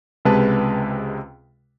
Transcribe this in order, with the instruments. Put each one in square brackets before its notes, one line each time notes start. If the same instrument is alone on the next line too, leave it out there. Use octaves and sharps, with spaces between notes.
[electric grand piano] C#2 C3 G#3 B4 A5